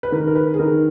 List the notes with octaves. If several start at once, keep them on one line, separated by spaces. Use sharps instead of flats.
B4
D#3 A#4
A#4
B4
G#4
D#3 A#4